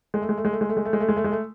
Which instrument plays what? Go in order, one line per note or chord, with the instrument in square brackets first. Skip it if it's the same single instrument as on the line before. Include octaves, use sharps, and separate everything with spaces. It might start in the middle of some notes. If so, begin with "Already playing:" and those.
[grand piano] G#3
A3
G#3
A3
G#3
A3
G#3
A3
G#3
A3
G#3
A3
G#3
A3
G#3
A3